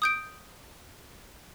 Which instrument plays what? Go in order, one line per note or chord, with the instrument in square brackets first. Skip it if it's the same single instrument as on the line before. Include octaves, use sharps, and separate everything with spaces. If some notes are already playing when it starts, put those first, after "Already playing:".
[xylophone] D#6 G6 D7